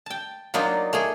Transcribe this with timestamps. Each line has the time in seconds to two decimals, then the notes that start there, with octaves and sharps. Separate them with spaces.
0.06 G5 A5
0.54 F#3 A#3 D4 D#4 F4
0.93 A3 A#3 G#4